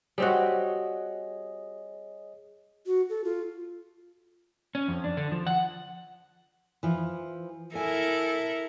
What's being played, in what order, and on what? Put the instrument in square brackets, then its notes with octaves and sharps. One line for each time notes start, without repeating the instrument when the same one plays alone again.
[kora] G3 C4 F#4 [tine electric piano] G#4 C#5 D#5
[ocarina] F#4
A4
F4
[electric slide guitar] C#4
F2
D4
D3
F3
F#5
[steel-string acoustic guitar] E3 F3
[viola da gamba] E4 A4 A#4 [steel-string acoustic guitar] G#5